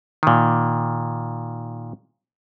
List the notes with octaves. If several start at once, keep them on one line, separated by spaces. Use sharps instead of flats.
A#2 D#3